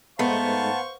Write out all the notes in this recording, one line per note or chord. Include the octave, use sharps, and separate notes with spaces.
G#2 A3 B3 D#4 C5 F5 A5 C#6